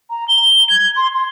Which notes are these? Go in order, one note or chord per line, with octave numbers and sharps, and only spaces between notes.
A#5
G7
G#6
C6
C6